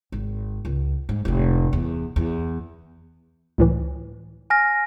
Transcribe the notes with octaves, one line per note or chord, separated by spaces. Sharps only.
G#1
C#2
G#2
F1 A2
E2
E2
C#2 A2 E3
G#5 F6 A#6